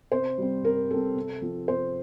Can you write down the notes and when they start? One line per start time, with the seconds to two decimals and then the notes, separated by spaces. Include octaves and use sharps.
0.12 C3 C5
0.38 G3 C4
0.63 C3 A#4
0.90 G3 C4 A4
1.16 C3
1.42 F3 C4
1.68 C3 C5